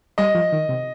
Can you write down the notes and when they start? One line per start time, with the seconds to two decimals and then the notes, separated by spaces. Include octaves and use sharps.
0.18 G3 D#5
0.35 F3
0.52 D#3
0.69 C3